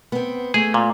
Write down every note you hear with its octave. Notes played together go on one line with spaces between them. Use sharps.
B3 C4
A3 G#4
A#2